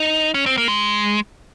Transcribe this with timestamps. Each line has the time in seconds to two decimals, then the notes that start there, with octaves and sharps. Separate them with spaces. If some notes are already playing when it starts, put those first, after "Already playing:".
Already playing: D#4
0.34 C#4
0.46 C4
0.57 A#3
0.68 G#3